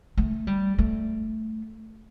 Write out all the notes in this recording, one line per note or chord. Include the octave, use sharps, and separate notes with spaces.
A3
G3
A3